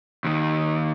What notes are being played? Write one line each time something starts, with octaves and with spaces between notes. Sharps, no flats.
D#2 D#3